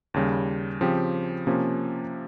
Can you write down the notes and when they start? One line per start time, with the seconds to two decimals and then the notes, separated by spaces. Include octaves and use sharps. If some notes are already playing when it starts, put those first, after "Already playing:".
0.14 D#2 C#3 G3
0.81 C#3 F3 C4 G4
1.47 C3 F3 A#3 C#4